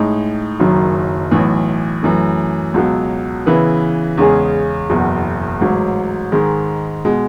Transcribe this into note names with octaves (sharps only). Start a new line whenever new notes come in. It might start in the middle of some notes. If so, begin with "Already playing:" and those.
Already playing: A2 G#3 D#4
F#1 F#2 D#3 F#3
B1 A2 E3
F#2 E3 A3
C#2 B2 F#3
C#3 E3 B3 E4 B4
E2 C#3 G#3 C#4 G#4
F#1 E2 B2
A1 G#2 F#3
G#2 D#3 G#3
B2 G#3